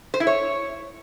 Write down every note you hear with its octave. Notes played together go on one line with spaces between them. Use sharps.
C5
E4
C#5